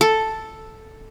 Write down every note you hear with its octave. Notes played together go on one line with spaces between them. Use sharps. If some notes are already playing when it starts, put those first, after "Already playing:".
A4